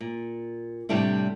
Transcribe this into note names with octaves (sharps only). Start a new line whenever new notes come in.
A#2
A2 C3 G3 A3 D4 E4